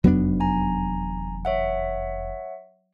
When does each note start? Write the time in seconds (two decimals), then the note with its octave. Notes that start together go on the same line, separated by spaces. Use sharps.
0.04 F1 E2 F#3 B3 D4
0.40 G#5 A#5
1.45 C#5 E5 F#5